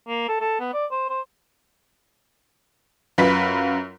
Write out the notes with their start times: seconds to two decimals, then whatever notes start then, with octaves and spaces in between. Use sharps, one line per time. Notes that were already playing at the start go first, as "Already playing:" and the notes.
0.08 A#3
0.28 A4
0.41 A4
0.60 B3
0.73 D5
0.91 C5
1.09 C5
3.18 F#2 F4 B4 B6